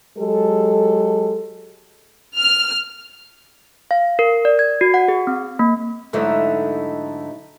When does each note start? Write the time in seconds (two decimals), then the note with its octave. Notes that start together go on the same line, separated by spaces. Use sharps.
0.18 F#3 G#3 G4 A4
2.38 F6
3.91 F5
4.19 A#4
4.45 D5
4.59 G#6
4.81 F#4
4.94 F#5
5.08 G#4
5.27 C4
5.59 A#3
6.13 G#2 D3 F#3 A3 D#4 E4